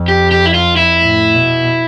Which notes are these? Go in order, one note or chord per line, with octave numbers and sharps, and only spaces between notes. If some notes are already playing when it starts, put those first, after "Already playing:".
Already playing: F2
G4
G4
E4
F4
E4
A2
B2